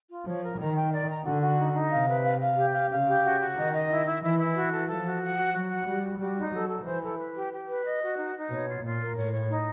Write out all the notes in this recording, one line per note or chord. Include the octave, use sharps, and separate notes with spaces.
F4
F3 C#5
A#4
D#3 A#5
G5
D5
A#5
D3 F#4
F#4
D#4
D#4
C3 F5
B4
F5
F5
G4
F5
C#3 F5
G4
F#4
F#4
D#3 D#5
D#5
E4
E4
E3 E4
E4
F#4
A4
F3 A4
F#4
F#5
F#4
F#3 F#4
F#5
G3 F#4
F#4
G3 F#4
D#4
F#3 A4
A4
E3 C5
A4
B4
G4
G4
B4
D#5
F#4
D#4
D#4
B2 C#5
F4
A#2 F4
A#4
A2 C#5
C#5
D#4